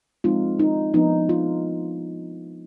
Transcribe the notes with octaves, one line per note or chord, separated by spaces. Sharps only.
F3 G#3 C4 D#4 F4
D#4
F3 B3 D4 D#4
F4